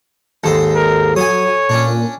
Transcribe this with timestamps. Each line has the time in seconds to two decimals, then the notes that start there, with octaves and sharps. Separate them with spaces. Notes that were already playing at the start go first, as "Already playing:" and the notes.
0.44 D#2 G#2 A4 C5
0.75 A#4
1.16 F#3 C#5 G#5 D#6
1.69 A#2 C#4 D4